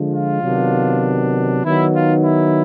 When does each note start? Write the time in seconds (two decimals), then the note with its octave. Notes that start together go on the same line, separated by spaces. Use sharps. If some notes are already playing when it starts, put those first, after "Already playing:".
Already playing: D3 F3 G#3
0.13 F4
0.42 C3 D#3 F#3 B3 D4
1.64 D#3 F#3 B3 D#4 E4
1.94 F4
2.25 E4